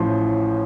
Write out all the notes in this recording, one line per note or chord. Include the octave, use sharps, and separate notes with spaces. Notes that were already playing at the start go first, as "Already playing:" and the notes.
Already playing: A1 A2 F3 C6